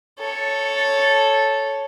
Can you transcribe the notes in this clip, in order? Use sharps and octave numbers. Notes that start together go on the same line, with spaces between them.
A4 C#5